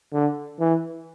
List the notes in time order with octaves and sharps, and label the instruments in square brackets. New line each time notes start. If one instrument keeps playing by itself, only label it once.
[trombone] D3
E3